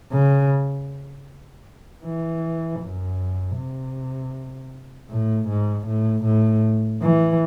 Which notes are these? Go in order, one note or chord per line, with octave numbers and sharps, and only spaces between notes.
C#3
E3
F#2
C3
A2
G#2
A2
A2
E3